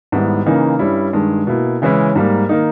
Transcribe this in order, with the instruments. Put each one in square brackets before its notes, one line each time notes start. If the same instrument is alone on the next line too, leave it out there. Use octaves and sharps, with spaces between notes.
[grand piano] G#2 D#3 G3 B3 E4
C#3 E3 A#3 D#4
G2 G3 C#4 E4
G2 D#3 G#3
B2 A#3 E4
C#3 E3 G#3 C#4 E4
G#2 G3 A#3
D#3 A#3 D#4